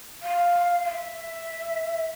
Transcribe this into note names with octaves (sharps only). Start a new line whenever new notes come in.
F5
F5
E5